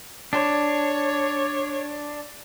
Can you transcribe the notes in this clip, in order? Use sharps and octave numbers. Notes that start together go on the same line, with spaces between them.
D4 C#5